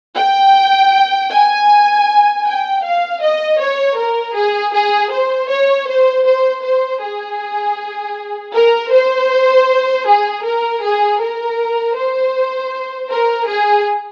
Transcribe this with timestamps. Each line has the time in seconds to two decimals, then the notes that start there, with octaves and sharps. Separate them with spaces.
0.17 G5
1.31 G#5
2.45 G5
2.84 F5
3.22 D#5
3.59 C#5
3.97 A#4
4.35 G#4
4.74 G#4
5.12 C5
5.50 C#5
5.88 C5
6.26 C5
6.64 C5
7.02 G#4
8.54 A#4
8.92 C5
10.07 G#4
10.44 A#4
10.82 G#4
11.20 A#4
11.96 C5
13.10 A#4
13.49 G#4